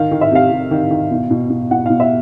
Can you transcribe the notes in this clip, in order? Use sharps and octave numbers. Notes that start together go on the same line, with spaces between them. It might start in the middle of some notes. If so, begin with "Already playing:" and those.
Already playing: D#3 F5
D#3
E5
C3 F5
C3
D#3
D#3
B2
B2
B2
B2 F#5
B2 F5
E5